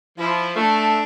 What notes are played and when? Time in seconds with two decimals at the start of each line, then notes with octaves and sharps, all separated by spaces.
0.19 F3 E4
0.56 A3 D4